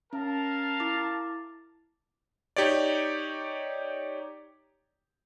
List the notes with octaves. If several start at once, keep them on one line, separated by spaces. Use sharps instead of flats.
C#4 A#4 F5 A5
E4 D6 A6
D#4 G4 C#5 D5